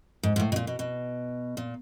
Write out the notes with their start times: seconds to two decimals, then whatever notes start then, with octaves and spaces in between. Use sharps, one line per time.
0.23 G#2
0.36 G#2
0.40 A2
0.52 B2
0.56 A#2
0.67 B2
0.79 B2
1.57 A#2